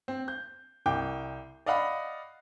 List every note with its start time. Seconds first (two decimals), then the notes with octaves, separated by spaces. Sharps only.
0.08 C4
0.28 G6
0.86 C2 G5 D6 G6
1.66 D5 D#5 F5 F#5 B5